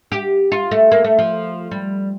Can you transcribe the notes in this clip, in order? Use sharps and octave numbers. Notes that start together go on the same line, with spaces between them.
G4
F4
A3
A#3
A3
F3
G3